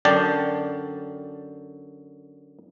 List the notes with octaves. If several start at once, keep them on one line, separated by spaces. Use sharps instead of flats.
F#2 D3 D5 G5 A5